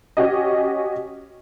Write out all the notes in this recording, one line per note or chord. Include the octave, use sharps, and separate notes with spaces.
C#4 F#4 G4 D#5